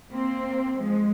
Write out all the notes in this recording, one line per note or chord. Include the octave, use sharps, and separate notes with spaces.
A#3 C4
F3 G#3